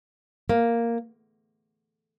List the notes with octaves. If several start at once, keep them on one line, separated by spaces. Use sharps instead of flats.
A#3